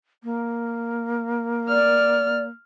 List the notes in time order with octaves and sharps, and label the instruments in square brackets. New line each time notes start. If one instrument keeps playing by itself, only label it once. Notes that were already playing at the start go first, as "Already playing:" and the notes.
[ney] A#3
[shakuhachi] D5 [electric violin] F6